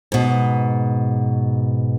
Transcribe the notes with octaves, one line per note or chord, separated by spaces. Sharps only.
G#2 B2